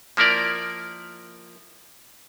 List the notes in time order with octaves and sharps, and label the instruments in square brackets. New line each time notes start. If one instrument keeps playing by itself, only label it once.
[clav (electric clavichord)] F3 A#3 E4 A#4 D5